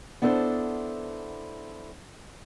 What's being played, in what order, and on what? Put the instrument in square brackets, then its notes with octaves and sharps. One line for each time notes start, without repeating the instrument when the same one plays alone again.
[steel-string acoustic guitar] B3 D4 E4 A4 C5